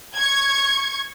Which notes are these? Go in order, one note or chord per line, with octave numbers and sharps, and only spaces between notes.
C#6 G#6